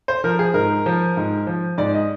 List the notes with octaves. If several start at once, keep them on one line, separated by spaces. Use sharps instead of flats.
C5
F3 A#4
G#4
G#2 A#4
F3
G#2
F3
G#2 D5
D#5